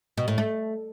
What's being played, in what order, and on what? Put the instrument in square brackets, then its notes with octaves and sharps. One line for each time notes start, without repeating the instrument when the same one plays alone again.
[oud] B2
A2
A3